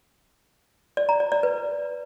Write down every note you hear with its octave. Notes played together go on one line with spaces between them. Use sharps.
D5
A#5
D5
D5
B4